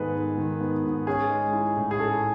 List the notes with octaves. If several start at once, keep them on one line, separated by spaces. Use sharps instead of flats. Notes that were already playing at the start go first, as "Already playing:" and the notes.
Already playing: G#2 D#3 G#3 B3 G#4 A4 B4
G#3
D#3
B3
G#2
C#4 G#4
G#3
E4
A2
G#4
C#4 A4